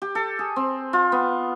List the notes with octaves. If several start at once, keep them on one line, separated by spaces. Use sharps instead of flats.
G4
A4
G#4
C4
F4
B3